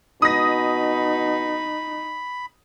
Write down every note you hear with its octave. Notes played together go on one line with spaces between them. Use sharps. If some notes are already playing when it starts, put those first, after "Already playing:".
B2 D#4 B5 D#6 A#6